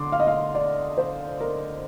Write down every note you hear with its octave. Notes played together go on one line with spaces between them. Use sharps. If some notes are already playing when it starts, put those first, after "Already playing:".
Already playing: D3 C6 D6
F5
D#5
F5
D5
C5
A#4